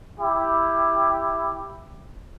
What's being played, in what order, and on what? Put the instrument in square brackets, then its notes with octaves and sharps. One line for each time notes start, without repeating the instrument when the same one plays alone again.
[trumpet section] E4 G4